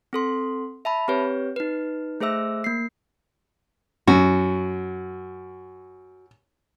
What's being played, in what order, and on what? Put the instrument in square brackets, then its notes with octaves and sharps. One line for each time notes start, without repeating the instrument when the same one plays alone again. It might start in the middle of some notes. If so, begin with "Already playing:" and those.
[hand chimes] C4 A4 C6
E5 A5 B5
C4 G4 B4 C#5
D#4 B4
A3 G#4 C5 E5 E6
A#3 C7
[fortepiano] F#2 [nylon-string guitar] F#4